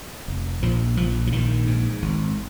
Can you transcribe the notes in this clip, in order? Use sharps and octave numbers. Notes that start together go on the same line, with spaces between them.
F1
A#1 F3
A#1 F3
F3
A#1 D#3
G#2
G#1